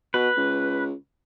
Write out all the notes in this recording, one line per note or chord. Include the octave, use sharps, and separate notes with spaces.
B2 B4
C#2